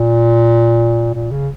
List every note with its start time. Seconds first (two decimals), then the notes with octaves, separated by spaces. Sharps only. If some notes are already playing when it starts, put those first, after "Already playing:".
Already playing: A#2
1.14 A#2
1.31 C#3